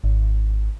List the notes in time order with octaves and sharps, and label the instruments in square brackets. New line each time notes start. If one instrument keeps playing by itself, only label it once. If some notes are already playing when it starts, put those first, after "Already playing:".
[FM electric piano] G#1